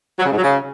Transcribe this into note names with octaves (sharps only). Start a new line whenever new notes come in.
F#3
C#3
G#2
F#3
C#3